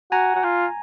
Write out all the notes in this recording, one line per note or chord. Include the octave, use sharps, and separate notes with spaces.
F#4 G#5 A#5
F#4
F4